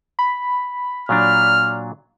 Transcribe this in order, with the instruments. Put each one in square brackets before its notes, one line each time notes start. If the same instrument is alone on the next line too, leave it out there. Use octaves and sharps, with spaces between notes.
[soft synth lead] B5
[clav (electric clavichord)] A#2 F#3 D4 [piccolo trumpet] F6